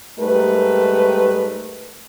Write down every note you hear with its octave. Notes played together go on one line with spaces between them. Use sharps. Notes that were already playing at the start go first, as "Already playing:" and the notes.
G#2 G3 A3 A#4 B4